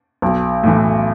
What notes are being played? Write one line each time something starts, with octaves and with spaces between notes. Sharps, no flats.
B1
A2 E3